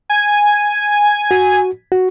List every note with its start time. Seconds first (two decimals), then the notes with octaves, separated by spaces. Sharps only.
0.10 G#5
1.31 F#4
1.92 F#4